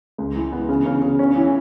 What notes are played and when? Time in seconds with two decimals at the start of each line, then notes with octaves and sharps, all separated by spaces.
0.18 C#2
0.36 E3
0.52 B3
0.69 C#3
0.86 C#3
1.02 C#3
1.19 C#4
1.36 E3